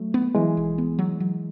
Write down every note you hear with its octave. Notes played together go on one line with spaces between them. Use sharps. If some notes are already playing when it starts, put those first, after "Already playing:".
Already playing: F#3 A3
B3
E3 F#3 G#3
B1
B3
F#3
F#3